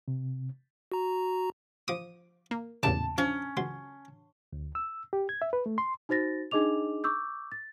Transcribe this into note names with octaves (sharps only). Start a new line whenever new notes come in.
C3
F#4 A#5
F3 D6 D#6
A#3
A1 E2 A#2 C#3 A5 D6
F3 C#4
C#2 F#3 C6
D2
E6
G4
G#6
E5
B4
A3
C6
D#4 F#4 C5 A6 A#6
D4 D#4 G#4 D#5 D6 F7
C#6 D6 E6 G6
A6